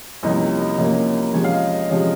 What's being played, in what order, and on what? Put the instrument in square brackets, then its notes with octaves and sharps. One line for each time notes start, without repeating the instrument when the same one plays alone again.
[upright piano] C2 C3 F3 A#3 C#4 D#5
D#5
C2 C3 F3 A#3 C#4
C3 F3 G#3 C#4 C#5
F5
D#5
D#5
C3 F3 G#3 C#4 D#5